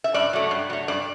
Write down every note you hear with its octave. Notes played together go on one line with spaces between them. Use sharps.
E5
G2 D5
F#3 A3
G2
F#3 A3
G2 D5